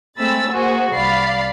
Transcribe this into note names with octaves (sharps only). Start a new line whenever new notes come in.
G#3 A3 C4 B5 E6 A6
A#3 F#4 G#4 C5
C2 D5 F5 B5 A6 C7